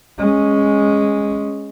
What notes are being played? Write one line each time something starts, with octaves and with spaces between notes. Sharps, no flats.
G#3 C#4